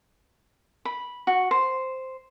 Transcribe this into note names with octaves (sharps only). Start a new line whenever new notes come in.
B5
F#4
C5